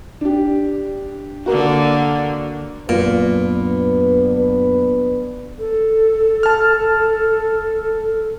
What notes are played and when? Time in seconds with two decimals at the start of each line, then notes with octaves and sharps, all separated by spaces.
0.21 D4 G4
1.46 D3 A#3 F#4 A#4
2.89 F#2 A#2 B3 D4 B4
5.59 A4
6.43 A5 F6